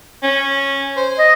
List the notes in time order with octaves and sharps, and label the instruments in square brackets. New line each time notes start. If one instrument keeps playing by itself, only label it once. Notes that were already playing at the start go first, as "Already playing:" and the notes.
[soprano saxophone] C#4
C5
[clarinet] D#5